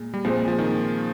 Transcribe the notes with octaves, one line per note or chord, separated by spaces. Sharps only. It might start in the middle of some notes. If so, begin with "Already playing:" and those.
Already playing: A#2 G#3
G3
A#2 F3 G#3 C4
F3
D#3